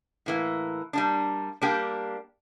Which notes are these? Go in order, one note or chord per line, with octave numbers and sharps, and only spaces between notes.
A2 E3 A#3
G3 A#3 D4
G3 A#3 D4 G4